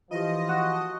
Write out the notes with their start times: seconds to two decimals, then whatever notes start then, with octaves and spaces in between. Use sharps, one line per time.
0.11 E3 F3 F4 G4 D#5
0.49 F#4